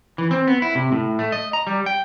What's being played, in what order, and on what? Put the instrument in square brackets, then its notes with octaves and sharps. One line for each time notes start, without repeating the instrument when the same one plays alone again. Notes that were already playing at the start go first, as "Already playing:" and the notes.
[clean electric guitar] E3
C4
B3
E4
C3
A2
A3
D#5
A#5
G3
G5